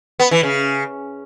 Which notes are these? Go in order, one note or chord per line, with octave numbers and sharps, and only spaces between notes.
B3
E3
C#3